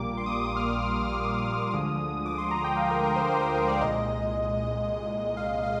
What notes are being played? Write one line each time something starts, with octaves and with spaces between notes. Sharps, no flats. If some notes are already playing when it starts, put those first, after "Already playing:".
Already playing: A#1 A#2 G3 A#3 D6
C6
D#6
D6
D#6
F6
D#6
F6
F6
D#6
D2 D3 F3 G#3
D6
C6
A#5
G5
F5
A#4
A#4
C5
C5
C5
A#4
D5
C2 A#2 G#3 D#5
F5
F5